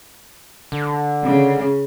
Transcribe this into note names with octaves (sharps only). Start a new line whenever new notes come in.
D3
C#3